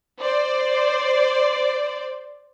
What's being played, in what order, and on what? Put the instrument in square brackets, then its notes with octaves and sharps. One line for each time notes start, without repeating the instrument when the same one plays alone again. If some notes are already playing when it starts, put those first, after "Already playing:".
[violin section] C5 D5